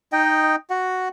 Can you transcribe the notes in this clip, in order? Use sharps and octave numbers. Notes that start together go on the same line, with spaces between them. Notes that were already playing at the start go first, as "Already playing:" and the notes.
D#4 D#5 G5
F#4 F#5